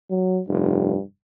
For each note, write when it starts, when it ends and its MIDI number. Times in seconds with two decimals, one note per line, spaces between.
0.11 0.41 54
0.48 0.94 29
0.48 1.02 43